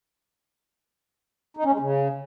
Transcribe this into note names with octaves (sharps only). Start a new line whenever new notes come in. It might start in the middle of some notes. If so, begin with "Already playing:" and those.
D#4
C#4
G#3
C#3